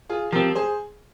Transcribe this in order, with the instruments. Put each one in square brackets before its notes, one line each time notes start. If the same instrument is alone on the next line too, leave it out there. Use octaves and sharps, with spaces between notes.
[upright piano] F4 G#4
[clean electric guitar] F3 C4 [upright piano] G4 A#4
[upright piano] G#4 C5